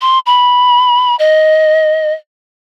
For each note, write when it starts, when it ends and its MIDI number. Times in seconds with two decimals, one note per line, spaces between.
0.01 0.19 84
0.26 1.16 83
1.19 2.13 75